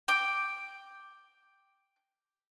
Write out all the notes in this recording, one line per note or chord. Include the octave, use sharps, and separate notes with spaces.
G5 D6